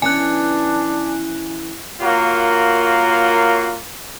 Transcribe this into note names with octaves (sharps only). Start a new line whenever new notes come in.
E3 B3 C#4 D4 G#5 F#6
A#3 F4 F#4 A#4 C#5